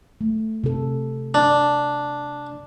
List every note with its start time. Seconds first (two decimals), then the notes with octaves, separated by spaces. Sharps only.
0.21 A3
0.64 C3 A4
1.34 D4 D5